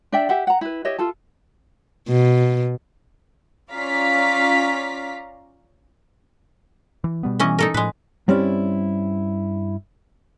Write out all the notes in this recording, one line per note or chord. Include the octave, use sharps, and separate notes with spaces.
D4 D5 E5 G5
G4 E5 F#5
F#5 A#5
E4 B4
G4 C#5 D#5 E5
F4 A4 A5
B2
C#4 F4 D5 F5 A#5 B6
E3
B2 G3 B3
E3 C#4 D#5
D#4 A4 A#4
A2 F3 G#3 B4
G2 G3 C4 C#4 E4 D5